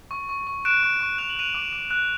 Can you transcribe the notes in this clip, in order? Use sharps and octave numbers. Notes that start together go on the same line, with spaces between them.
C#6
C#6
C#6
F#6 D7 E7
C#6
C#6
F#6 F7
F#7
F#6 D#7 F7
D6
D6
F#6